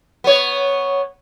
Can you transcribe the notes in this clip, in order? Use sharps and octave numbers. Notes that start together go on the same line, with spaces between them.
B3 C#5